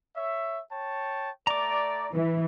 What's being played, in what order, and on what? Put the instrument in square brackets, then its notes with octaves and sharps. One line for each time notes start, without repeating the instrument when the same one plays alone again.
[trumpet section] C#5 E5
C#5 G5 A5
[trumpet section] A3 D5 [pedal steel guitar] A#5 D6
[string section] E3